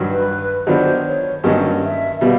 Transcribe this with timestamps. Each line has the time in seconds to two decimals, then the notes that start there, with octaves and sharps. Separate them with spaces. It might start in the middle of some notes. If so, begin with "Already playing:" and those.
Already playing: G2 D#3 F#3
0.08 B4
0.66 D#3 F#3 B3 D4 F4 C5
1.06 C#5
1.43 G2 D#3 F#3 A#3 C#4 D#5
1.83 E5
2.21 B2 G3 B3 F5